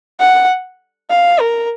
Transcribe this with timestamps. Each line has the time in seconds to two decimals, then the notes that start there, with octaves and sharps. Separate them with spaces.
0.20 F#5
1.10 F5
1.40 A#4